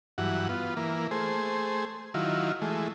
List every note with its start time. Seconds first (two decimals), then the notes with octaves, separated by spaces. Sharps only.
0.18 G2 E3 F#3 F#5
0.49 B3 F4
0.77 E3 A#3
1.11 A3 G#4 C5
2.14 D#3 F#3 E4 F4
2.62 E3 G#3 A3